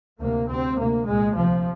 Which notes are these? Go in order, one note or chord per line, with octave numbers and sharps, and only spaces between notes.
D2 C3 A#3
D2 C3 C4
D2 C3 A#3
C2 A#2 G#3
D2 C3 F3